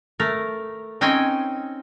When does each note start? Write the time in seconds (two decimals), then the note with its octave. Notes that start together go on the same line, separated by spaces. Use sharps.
0.20 A3 A#4
1.01 C4 C#4 D#4 G5 G#5